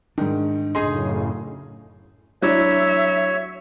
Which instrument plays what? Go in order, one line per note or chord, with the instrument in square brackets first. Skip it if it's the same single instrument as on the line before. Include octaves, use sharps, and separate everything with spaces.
[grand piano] G#2 D#3 [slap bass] D4
[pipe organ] F#2 A2 C#3 [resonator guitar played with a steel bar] D#4 G#4 [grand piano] C6
[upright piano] F#3 D4 E4 [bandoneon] C#5 [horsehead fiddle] E5